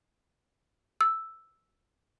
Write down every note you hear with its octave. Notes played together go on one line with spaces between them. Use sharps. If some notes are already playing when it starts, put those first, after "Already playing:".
E6